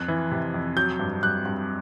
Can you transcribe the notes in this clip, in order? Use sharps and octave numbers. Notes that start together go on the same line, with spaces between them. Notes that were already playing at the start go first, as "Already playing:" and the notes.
Already playing: F2 F#6
E3
C3
F2
F#3 G6
G2
G2 F#6
G2